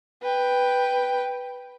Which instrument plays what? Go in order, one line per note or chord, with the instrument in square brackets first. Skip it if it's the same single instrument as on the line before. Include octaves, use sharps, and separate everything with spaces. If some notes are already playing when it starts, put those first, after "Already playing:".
[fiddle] B4 G5